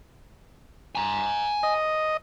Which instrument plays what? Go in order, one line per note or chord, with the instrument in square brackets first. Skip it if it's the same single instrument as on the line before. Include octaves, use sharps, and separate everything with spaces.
[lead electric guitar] G#5 A#5
[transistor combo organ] D#5